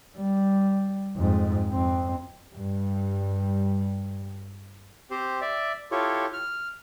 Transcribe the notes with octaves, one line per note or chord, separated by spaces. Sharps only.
G3
F2 G#2
F2 C4
G2 G3
C4 G4 C5
D5 E5
E4 F4 G4 A4 C#5
F6